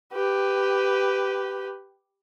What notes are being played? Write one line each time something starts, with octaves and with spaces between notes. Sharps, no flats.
G4 B4